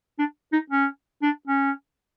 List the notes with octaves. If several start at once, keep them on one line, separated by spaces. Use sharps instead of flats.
D4
D#4
C#4
D4
C#4